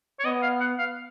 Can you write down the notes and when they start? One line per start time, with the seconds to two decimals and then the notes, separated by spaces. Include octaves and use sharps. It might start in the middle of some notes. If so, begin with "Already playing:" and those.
0.20 C#5
0.24 B3 D#5
0.42 F5
0.60 F#5
0.79 F5